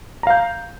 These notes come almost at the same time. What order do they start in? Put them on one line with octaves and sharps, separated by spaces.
A#5 F5 G6